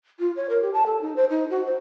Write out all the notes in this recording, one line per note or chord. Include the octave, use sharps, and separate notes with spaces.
F4
C#5
A#4
G4
A5
A4
D#4
C5
D#4
F#4
C5